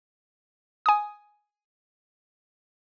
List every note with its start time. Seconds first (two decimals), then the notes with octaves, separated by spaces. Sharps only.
0.86 G#5 D#6